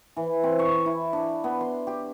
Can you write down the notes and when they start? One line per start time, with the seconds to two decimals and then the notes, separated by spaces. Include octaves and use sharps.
0.16 E3
0.43 C4
0.59 C#6
0.86 E4
1.13 D4
1.44 B3
1.61 C6
1.87 G4